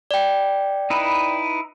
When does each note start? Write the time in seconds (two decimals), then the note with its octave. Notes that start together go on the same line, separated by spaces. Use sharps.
0.11 D5 G5
0.90 D#4 E4 B4